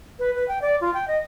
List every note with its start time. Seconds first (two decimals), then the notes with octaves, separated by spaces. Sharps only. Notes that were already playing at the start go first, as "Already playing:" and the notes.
0.19 B4
0.35 B4
0.48 G5
0.62 D5
0.81 F4
0.94 G5
1.08 D#5